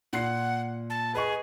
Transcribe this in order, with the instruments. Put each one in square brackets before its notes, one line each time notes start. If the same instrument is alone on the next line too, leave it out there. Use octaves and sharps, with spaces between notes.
[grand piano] A#2 C6 C7 [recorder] F#5
[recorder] A5
[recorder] G#4 [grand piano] B4 D#5 C#6